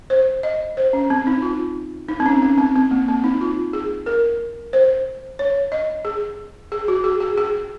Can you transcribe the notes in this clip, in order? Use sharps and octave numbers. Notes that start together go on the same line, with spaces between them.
C5
D#5
C5
C#4
C4
D#4
F4
D#4
C4
C#4
C#4
C4
C4
A#3
C4
D#4
F4
G#4
A#4
C5
C#5
D#5
G#4
G#4
F#4
G#4
G#4
G#4